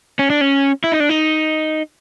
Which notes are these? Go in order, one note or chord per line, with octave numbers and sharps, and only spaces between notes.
C#4
D4
C#4
E4
D#4
D4
D#4